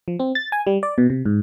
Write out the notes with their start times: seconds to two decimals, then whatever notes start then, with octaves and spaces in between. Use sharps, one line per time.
0.08 F3
0.19 C4
0.35 A6
0.52 G#5
0.67 G3
0.83 D5
0.98 B2
1.10 C3
1.25 G#2